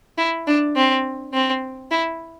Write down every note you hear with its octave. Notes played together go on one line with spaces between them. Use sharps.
E4
D4
C4
C4
E4